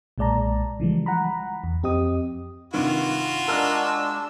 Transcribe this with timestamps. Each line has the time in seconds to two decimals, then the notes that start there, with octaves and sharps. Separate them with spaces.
0.18 B1 A#2 G#3 D5 A5 A#5
0.80 C#3 E3 F3 G3 G#3
1.06 F#5 A#5 B5
1.64 E2
1.83 F2 C4 G4 D#5 D#6
2.74 G2 C3 D#3 F4 F#4
3.48 G#3 D4 A#4 E6 F6